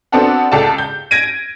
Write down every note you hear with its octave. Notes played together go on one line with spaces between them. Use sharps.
B3 C4 D4 F#4 A4 F#5
C#2 A4 D5 G5 A5
G6
G#6 A#6 D7 D#7